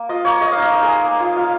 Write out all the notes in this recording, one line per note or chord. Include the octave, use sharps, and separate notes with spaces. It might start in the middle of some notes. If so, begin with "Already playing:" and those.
Already playing: A#3
F4 D#5
A#3 C#5
G#3 D#5
D#4 F5
D#5
D#4 A#4
G#4
G#3
A#3
F4
F4 F5